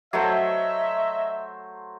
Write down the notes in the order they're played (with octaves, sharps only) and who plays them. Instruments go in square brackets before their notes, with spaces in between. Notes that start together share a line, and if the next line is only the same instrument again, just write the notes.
[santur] F#3 A3 C5 [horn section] C#5 D#5 E5